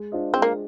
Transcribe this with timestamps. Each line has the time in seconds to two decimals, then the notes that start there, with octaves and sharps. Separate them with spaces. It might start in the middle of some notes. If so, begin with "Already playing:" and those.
Already playing: G#3
0.12 D4 F4 C5 D#5
0.33 G#3 C4
0.42 A#3